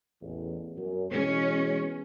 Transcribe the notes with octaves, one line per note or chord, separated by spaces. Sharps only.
A1 E2
F#2
B2 E3 G#3 C#4